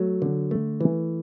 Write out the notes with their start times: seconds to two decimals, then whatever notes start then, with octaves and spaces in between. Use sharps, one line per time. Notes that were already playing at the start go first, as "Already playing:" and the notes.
Already playing: F#3 A3
0.22 D3
0.51 A3
0.81 E3